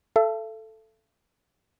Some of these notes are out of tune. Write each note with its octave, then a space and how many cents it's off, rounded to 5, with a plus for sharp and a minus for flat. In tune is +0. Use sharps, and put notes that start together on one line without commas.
A4 +0 E5 +45